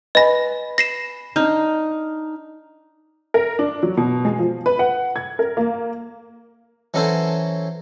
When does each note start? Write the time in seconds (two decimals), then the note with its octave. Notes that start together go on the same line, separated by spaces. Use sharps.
0.15 B4 D#5 G#5 B5 A#6
0.78 A#6 C7 E7
1.36 D4 D#4 F6
3.34 A#4
3.59 D4
3.83 F#3
3.97 B2
4.25 G#3
4.39 F3
4.66 B4
4.79 F#5
5.16 G#6
5.39 A#4
5.57 A#3
6.94 E3 F#3 C#4 F#4 A4 C5